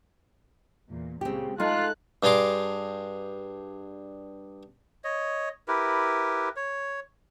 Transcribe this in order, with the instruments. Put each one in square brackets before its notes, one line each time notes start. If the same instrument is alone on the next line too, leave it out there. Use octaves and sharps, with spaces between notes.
[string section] E2 A#2
[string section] C#2 A#2 C#3 [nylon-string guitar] C4 G4
[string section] G#3 A5 F#6 [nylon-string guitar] A3 D#4 [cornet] F4
[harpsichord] G2 D4 G#4 A#5 C6 D6
[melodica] C#5 D#5
E4 G4 A#4 B4
C#5